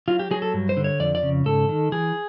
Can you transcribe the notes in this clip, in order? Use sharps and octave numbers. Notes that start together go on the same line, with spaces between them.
F#3 F4
G4
F#3 G#4
A4
G2
C5
D3
C#5
F2 D5
D5
C#3
G#2 A4
D#3
E3 G#4